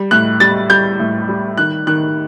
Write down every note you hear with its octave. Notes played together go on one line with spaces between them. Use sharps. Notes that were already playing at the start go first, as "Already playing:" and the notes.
Already playing: G3
A2 F#6
G3 A6
G3 G6
A2
G3
D#3 F#6
D#3 F#6